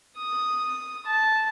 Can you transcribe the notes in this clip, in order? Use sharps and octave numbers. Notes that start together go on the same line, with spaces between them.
D#6
A5